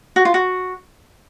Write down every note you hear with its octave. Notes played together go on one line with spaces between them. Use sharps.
F#4
F4
F#4